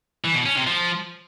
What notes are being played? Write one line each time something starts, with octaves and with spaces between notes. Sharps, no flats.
E3
B2
C#4
C3
F3